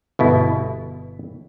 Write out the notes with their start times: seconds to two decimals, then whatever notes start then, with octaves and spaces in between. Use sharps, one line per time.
0.19 G1 B2 E4